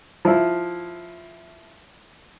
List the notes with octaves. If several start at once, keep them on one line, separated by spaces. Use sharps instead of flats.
F3 E4